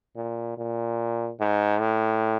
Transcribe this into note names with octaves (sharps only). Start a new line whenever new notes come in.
A#2
A#2
G#2
A2